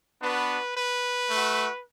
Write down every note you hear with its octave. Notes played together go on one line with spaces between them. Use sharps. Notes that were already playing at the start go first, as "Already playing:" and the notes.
B3 D4 F#4 B4
B4
A3 F#4